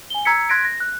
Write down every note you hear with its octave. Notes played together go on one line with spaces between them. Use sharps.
G#5 G7
A#5 E6 G#6 B6 C#7
C6 F#6 G#6 A#6 B6 D7
A#6
F#6